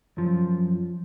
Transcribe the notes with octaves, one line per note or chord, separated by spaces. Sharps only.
F#2 F3